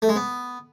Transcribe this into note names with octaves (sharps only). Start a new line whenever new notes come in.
A3
G#3
B3